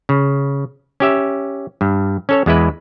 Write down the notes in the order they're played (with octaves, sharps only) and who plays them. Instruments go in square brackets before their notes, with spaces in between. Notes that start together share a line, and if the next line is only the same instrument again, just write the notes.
[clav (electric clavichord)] C#3
C#4 G4 E5
G2
C#4 A4 C#5
E2 G#3 E4 B4